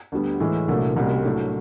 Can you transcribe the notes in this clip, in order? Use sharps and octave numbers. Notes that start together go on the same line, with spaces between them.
D2 D3 G3 B3
A2 E3 G#3
C2 A#2 F#3 A3 D4
C2 B2 G3 A#3 C#4
A2 F#3 A3 D4